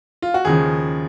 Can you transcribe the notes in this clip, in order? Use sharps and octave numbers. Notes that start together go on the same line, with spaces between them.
F4
F#4
D#2 C#3 F3 G#4